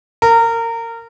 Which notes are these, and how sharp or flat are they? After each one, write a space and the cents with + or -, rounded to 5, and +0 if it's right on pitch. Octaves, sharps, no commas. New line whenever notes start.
A#4 -25